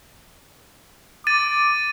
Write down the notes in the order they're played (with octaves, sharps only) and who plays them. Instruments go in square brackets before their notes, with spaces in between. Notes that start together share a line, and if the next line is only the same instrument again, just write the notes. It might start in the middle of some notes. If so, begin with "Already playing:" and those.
[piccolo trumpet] D6 [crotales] A6 D#7